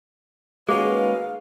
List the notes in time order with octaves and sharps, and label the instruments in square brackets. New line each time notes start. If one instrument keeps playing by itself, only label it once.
[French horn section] D#3 F#4 B4 [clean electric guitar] G#3 A#3 C#4 [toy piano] G#4 [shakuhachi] F5